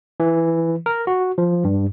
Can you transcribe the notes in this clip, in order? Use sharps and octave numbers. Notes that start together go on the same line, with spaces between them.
E3
A#4
F#4
F3
G2